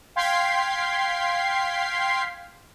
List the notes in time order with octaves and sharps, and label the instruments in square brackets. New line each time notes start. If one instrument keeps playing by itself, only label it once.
[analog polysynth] F5 G5 C6 G#6 B6 C7